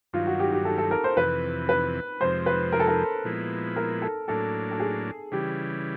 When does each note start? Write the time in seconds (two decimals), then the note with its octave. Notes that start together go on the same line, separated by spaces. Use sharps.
0.13 G2 D#3 F#3 F4
0.27 F#4
0.40 G4
0.52 G4
0.65 A4
0.78 A4
0.91 A#4
1.04 C5
1.17 F2 C3 E3 B4
1.69 B4
2.20 F2 C3 F3 G#3 C5
2.46 B4
2.72 A#4
2.80 A4
2.87 A#4
3.24 A#2 F3 G#3 B3 E4
3.76 A#4
4.02 A4
4.28 A2 F#3 A#3 D4 A4
4.71 A4
4.80 G#4
5.32 C#3 E3 G3 G4